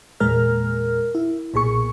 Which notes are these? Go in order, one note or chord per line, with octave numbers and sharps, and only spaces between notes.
E2 A#2 G#3 A#4 F6
E4
B1 A#2 G#4 C#6